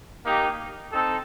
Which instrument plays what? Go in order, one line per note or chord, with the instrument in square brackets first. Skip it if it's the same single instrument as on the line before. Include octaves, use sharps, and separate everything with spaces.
[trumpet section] A#3 D#4 G4
C4 D#4 A4